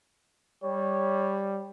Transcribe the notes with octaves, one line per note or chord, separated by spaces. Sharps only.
G3 C#5